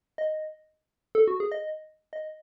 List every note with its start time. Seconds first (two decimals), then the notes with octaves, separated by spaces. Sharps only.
0.18 D#5
1.15 A4
1.27 F#4
1.40 G#4
1.52 D#5
2.13 D#5